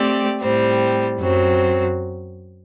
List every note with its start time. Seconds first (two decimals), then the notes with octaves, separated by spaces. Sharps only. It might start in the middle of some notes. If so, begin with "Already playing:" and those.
Already playing: A3 C4 G4 D5
0.42 A2 G3 C4
1.20 F#2 F#3 C4